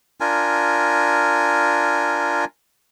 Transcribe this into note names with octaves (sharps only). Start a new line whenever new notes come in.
D4 F4 A#4 G#5